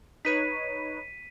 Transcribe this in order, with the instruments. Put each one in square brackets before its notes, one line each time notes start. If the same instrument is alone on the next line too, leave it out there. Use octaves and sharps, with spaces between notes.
[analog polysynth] D#4 B4 C#5 [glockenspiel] B6 D#7